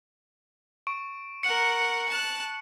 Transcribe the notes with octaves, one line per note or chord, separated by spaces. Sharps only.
C#6 D7
A#4 F#5 C#7 F#7
A5 F#6